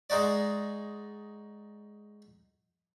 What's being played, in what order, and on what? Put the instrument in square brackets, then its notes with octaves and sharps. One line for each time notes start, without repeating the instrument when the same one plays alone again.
[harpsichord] G#3 D#4 F#4 D5